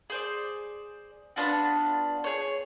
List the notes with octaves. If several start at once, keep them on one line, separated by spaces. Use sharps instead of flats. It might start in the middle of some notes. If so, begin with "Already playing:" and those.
G#4 C5 D5
B3 D4 F4 F#4
G#4 C#5